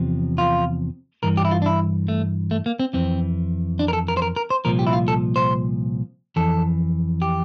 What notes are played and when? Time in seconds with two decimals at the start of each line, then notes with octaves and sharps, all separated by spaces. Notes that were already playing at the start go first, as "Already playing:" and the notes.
Already playing: E2 C3 F3
0.38 F4
1.23 G2 E3 A#4
1.37 G4
1.45 E4
1.51 F4
1.62 D4
1.66 E4
2.08 A3
2.51 A3
2.66 A#3
2.79 C4
2.93 F2 E3 C4
3.79 D4
3.88 A#4
3.93 A4
4.08 A#4
4.17 C5
4.22 A#4
4.36 A#4
4.50 C5
4.65 C2 A#2 F3 A#4
4.79 G4
4.87 E4
4.93 F4
5.08 A4
5.36 C5
6.36 F2 E3 A4
7.22 G4